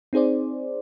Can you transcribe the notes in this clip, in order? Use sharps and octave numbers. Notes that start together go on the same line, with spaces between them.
C4 D#4 G#4 C5 D5